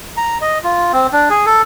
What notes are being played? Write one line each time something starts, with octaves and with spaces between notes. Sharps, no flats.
A#5
D#5
F4
C4
D4
G#4
A4